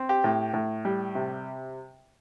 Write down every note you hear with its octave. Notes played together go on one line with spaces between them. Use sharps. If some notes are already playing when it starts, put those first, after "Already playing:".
Already playing: C4
G4
A2
A2
G3
C3